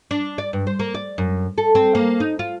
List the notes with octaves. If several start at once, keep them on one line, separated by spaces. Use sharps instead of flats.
D4
D5
G2
C5
A#3
D5
F#2
A4
C4
A#3
D#4
F4